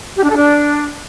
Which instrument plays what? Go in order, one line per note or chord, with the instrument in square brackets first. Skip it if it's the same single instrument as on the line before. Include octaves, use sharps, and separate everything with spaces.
[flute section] G4
D4
A4
D4